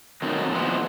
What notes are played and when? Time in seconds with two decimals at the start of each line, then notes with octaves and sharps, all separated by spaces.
0.22 D#3 F#3 A3 C4 D#4
0.51 A#2 F3 G#3 B3 E4